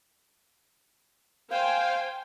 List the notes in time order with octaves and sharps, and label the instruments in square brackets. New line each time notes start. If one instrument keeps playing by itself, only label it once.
[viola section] C5 G5 G#5 [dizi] F5